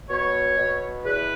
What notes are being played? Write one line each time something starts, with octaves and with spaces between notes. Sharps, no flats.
B2 C#5
B2
E2 B4